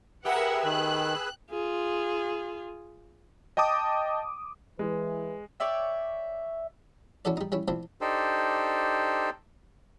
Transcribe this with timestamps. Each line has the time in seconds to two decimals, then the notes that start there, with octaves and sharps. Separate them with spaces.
0.25 G4 G#4 A#4 B4 E5 F#5 E6
0.64 D#3 F#6
1.51 F4 G#4
3.57 D#5 G5 A5 D6 D#6
4.79 E3 G#3 B4
5.60 C#5 D5 E5 G5
7.25 C#4 E4 F#4 A4 D5
7.37 G3 D#4
7.52 G3 C#4 E4
7.68 F3 C4 D4 E4
8.01 D4 D#4 G4 A4 C5